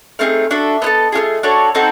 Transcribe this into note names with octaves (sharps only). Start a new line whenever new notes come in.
A3 C4 D#4 G#4 F5
D4 F#4 A4 E5
B3 E4 A4 D#5
A3 C#4 F4 G#4
D4 F#4 A4 C#5
C4 D#4 F#4 A4 C5